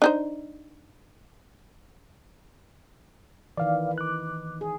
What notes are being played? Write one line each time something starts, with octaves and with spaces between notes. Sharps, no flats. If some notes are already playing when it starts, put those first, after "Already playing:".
D4 D#4 C5
D#3 E3 D5 F5
D6 F#6
G#4